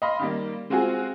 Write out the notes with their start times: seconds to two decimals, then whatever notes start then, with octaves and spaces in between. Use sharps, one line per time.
0.02 D#5 F5 B5 C6
0.19 D#3 G3 A#3
0.70 G#3 C4 F4 F#4 G#4